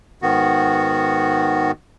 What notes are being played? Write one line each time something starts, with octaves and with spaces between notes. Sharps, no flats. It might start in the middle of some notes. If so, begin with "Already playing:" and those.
G#2 D#3 B3 F#4